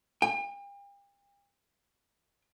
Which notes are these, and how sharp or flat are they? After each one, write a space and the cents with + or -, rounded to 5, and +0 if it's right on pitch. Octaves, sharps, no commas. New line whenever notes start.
G5 +40